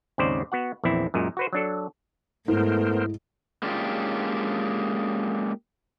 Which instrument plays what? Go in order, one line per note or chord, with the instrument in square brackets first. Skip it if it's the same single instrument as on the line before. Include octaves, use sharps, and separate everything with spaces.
[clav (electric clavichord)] D#2 G#2 C#3 C4 C5 D5
B3 F#4 F#5
A#1 E2 E3 C4 E4
F#2 A#2 G#3
F#4 B4 C5
F#3 D4 A4
[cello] G#2 [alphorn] A3 [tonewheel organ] B3 A#4 C5 [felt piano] E4
[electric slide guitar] G#3 A#3 C#4 D4 F4 G4